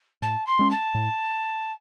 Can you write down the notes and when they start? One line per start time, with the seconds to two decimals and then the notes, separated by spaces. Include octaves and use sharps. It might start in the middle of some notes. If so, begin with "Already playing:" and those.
0.22 A2 A5
0.46 C6
0.59 G#3 C#4
0.70 A5
0.95 A2